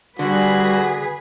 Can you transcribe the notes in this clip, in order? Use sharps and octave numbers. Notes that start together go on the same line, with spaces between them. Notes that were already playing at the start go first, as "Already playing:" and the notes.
D3 G3 F#4 G#4 B4